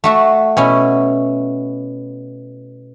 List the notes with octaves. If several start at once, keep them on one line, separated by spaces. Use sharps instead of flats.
A3 F#4 E5
B2 C#4 E4